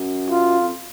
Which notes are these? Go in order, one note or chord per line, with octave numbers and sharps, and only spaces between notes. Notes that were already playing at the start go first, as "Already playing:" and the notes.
Already playing: F#2
F4
F2